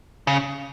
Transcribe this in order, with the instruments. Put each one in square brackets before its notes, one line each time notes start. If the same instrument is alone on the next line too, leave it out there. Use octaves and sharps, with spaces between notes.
[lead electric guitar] C#3